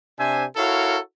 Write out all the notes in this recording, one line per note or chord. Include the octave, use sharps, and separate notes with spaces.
C3 D4 C5 E5 G#5
E4 F#4 A4 A#4 C#5 F5